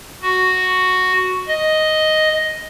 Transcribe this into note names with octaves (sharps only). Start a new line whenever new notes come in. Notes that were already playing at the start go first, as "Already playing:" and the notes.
F#4
D#5